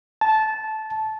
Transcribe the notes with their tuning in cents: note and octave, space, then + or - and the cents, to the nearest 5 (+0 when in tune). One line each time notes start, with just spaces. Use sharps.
A5 -15